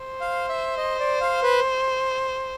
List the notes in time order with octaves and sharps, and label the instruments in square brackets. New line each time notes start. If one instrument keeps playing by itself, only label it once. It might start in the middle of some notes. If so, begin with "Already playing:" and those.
Already playing: [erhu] C5
[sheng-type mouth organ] F5
E5
D#5
D5
F5
B4